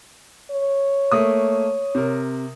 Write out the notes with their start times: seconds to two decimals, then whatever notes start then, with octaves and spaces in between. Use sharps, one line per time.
0.51 C#5
1.12 A3 A#3 D#6
1.95 C3 A#4